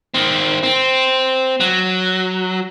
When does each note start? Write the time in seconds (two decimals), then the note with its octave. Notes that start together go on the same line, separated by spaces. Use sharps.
0.14 D#3 C4
0.63 C4
1.60 F#3